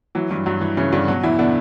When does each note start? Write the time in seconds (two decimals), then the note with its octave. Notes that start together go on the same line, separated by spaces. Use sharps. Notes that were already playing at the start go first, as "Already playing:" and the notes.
0.15 E3 F#3
0.31 G2 E3
0.46 G2 F#3
0.61 E3
0.77 C#3 E3 C#4
0.92 G2 D3 D4
1.08 B2 F#3 F#4
1.23 E2 E3 E4
1.38 B2 D3 D4